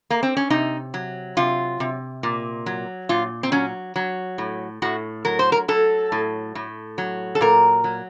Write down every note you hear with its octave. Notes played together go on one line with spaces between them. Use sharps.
A#3
C4
C#4
C3 D#4
F#3
C3 F4
C3
A#2
F#3
A#2 F4
C4
F#3 C#4
F#3
A2
A2 F#4
F#3 A#4
C5
A#4
F#3 A4
A2
A2
F#3
A4
A#2 A#4
F#3